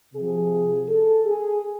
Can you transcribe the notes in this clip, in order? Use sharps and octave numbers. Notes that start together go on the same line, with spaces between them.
C3 F3 G#4
A4
G#4